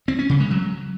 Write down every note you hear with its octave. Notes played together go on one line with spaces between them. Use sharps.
C4
C#4
C#3
G#3
F#3